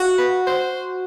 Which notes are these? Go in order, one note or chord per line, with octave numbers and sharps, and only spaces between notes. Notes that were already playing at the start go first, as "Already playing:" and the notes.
Already playing: F#4
B4
C5